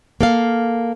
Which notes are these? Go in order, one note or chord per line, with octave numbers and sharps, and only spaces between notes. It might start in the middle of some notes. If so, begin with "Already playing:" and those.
A#3 A4 F5